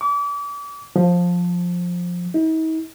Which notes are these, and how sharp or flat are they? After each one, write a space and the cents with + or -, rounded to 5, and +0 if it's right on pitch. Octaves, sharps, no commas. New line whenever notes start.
D6 -35
F3 +15
D#4 +45